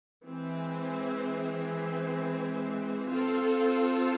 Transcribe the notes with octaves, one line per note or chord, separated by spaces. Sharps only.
E3 G#3 C4
C4 F4 A4